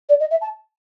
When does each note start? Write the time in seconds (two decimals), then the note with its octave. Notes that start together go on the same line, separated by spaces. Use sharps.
0.09 D5
0.19 D#5
0.30 E5
0.41 A5